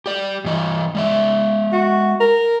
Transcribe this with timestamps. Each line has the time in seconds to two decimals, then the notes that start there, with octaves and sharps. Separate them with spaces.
0.06 G4 D5
0.44 G2 E3 D#5
0.95 G#3 D5 E5
1.72 F#4
2.20 A#4